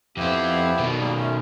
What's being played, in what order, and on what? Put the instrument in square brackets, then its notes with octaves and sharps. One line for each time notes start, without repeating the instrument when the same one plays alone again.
[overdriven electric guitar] F2 C4 [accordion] B3 E4 G4
[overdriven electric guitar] B2 D#3
[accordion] C#3 G3 A#3
A3 C#4